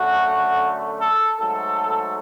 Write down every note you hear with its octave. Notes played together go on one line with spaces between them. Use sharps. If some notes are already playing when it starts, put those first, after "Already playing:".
Already playing: F#2 D3 A3 F#4
A4
G#2 F#3 A3 A4